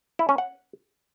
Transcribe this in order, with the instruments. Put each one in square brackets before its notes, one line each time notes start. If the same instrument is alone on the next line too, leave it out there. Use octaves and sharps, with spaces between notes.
[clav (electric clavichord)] E4
C#4
F#5